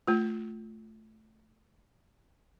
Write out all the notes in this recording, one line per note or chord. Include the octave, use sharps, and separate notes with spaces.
A3 F4